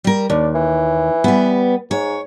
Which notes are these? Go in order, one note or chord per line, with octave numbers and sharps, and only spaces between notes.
G3 A#4
D#2 D4
E3
G3 B3
G#2 C#5